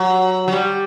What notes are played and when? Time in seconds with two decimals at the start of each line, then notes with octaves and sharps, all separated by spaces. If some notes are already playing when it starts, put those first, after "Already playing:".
Already playing: F#3
0.48 F#3
0.53 G3